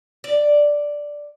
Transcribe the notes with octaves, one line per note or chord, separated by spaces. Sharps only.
D5